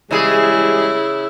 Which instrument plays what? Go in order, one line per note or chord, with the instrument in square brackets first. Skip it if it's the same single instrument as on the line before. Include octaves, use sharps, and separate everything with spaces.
[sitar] C#3 G#4 [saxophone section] E3 G3 G#3 [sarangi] E4